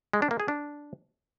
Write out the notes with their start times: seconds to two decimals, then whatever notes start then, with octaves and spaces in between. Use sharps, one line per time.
0.13 G#3
0.22 D4
0.31 A#3
0.40 G#4
0.48 D4